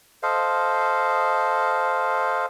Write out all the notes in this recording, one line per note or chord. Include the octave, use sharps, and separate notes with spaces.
A4 C5 D#5 F5